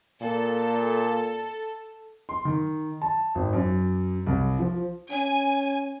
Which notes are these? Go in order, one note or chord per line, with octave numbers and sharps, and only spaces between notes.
A#2 A4
C6
D#3
A5
G#1
F#2
C2
F3
C#4 G#5